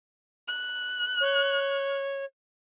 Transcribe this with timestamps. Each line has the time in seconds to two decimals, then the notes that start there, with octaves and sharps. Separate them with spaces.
0.48 F#6
1.20 C#5